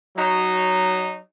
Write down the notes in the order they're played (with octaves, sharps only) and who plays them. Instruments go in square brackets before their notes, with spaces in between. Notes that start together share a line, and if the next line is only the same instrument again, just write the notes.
[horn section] F#3 D#4